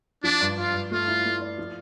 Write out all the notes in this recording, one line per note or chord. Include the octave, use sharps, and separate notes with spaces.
F3 D4
G2
G2 F4
G2
A3 F4
E4
A3
D5
F3